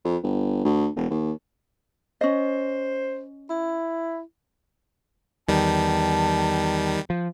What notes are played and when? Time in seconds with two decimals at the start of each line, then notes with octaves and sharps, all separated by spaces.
0.05 F2
0.23 G1
0.65 D2
0.96 E1
1.10 D#2
2.21 C#4 C5 D#5
3.50 E4
5.49 E2 D#3 G3 A5
7.10 F3